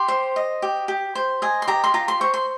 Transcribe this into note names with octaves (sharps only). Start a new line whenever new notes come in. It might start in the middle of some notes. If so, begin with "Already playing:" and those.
Already playing: G4 C6
C5
D#5
G4
G4
C5
D#5 G#5
C6
G4 A#5
C6
F4 A#5
C6
C5 C#6
C6